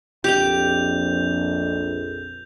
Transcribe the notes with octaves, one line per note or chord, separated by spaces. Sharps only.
A#1 F2 G4 G5 G6 F7